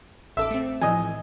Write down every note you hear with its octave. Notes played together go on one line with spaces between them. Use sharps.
A1 A4 E5 D6
A3 C4
A2 E3 F3 D#5 G#5